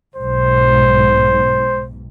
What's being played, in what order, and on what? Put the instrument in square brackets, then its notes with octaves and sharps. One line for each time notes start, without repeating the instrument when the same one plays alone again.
[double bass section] B1 G#2 [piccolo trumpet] C5